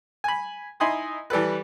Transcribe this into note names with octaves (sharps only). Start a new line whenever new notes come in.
G#5 B5
D#4 E4 G#5 B5 C6 D#6
E3 G3 A4 B4